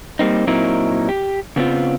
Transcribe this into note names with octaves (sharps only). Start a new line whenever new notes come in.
G3 A#3 C4 D#4
A#2 F#3 C4 D#4 E4 A#4
G4
C#3 B3 C4 F4